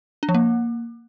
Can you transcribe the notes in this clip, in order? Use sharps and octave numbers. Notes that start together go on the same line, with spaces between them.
D4
F3
A#3